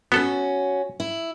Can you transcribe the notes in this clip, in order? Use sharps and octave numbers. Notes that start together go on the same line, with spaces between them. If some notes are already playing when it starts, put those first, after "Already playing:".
B3 C#4 F#4 A4
E4